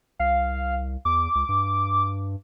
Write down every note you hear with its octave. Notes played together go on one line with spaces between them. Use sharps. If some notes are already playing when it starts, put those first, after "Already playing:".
C2 F5
E2 D6
C#2
G2